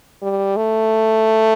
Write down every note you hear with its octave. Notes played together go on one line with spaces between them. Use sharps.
G3
A3